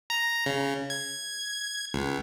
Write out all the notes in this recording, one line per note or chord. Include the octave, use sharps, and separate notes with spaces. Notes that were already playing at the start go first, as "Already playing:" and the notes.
A#5
C#3
G#6
C#2